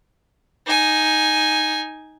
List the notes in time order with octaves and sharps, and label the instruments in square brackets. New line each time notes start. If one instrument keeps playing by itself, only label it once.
[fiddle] D#4 G#5